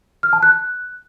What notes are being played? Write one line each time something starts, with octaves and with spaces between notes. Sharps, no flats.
F6
A5
F#6